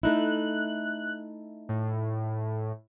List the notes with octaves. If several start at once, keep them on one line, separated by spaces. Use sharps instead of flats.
A3 D#4 E4 F#6
A2